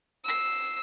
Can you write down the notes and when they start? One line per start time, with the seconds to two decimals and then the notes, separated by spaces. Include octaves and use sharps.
0.24 E6 C7